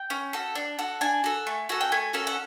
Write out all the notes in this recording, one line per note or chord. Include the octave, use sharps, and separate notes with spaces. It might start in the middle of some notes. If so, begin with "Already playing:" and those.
Already playing: G5
C#4
F#4 A4
D4
F#4 A4
D4 G#5
F#4 A4
A3
C#4 F#4 A4
G5
A3 G#5
C#4 F#4 A4
F#5